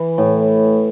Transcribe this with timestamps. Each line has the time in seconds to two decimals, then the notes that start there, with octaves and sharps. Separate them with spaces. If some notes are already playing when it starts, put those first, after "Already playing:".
Already playing: E3
0.18 A2